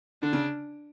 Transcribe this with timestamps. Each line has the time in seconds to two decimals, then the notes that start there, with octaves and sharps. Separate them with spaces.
0.23 D3 D4
0.33 C#3